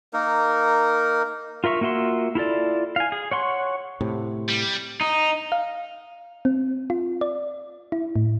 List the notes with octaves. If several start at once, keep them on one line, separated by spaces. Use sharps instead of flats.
A#3 D#4 A#4
F4 A#4 E5 C#6
A#3 F4 F#4 E5 C6
E4 F4 A4 D5
F5 G#5
G#4
C#5 F#5 C6 C#6
A2 C3
G3
D#4
F5
C4
F4
D5
E4
A2